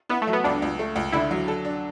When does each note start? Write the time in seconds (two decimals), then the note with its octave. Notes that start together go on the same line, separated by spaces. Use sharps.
0.09 B3 E4
0.22 A3
0.27 F#3
0.33 B3
0.44 C#2 D4
0.62 C#2
0.79 A3
0.96 C#2
1.12 D3 E4
1.31 F#3
1.48 A4
1.65 D4